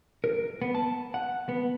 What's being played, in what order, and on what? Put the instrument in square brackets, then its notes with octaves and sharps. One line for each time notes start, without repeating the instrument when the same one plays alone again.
[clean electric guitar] A#4
B3
A5
F#5
B3